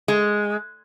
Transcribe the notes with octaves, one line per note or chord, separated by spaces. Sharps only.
G#3